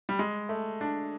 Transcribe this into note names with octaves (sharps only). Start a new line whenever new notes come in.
G3
G#3
A3
D4